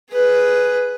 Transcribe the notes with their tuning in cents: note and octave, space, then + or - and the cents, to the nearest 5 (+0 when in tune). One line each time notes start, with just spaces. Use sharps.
G#4 +0 B4 +0